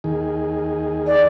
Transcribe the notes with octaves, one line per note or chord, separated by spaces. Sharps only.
D#2 D#3 G#4
D5